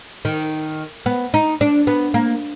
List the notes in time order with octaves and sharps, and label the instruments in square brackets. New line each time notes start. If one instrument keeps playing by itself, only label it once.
[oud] D#3
B3
D#4
D4
B3
A#3